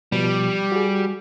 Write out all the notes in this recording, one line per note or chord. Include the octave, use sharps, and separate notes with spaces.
B2 F3 G3
F#4 G#4